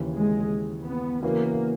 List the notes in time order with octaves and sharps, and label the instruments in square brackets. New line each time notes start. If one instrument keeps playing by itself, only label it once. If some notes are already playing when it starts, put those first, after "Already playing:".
Already playing: [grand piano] D#2 C#3 E3
[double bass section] G#3
B3
[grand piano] C#3 E3 B3 F#4 A#4 [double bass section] A#3